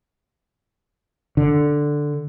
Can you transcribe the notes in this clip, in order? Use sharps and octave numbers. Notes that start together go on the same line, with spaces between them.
D3